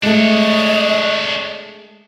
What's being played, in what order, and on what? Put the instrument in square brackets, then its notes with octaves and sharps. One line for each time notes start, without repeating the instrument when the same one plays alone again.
[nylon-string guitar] G#3 A3 [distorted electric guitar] D4 C#5 [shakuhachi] D#5